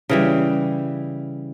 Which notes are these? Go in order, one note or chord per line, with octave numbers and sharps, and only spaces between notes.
C#3 E3 G3